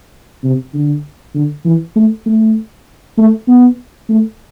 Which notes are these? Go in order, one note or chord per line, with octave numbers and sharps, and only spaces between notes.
C3
D3
D3
E3
A3
A3
A3
B3
A3